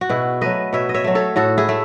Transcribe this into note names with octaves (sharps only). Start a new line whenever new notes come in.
F#4
B2 E4 G#4
F#3 A3 B4 D#5
B2 C#5 E5
D#5
C#5 E5
F#3 A3
A4 C#5
A2 F#4 A4
E4 G#4
A3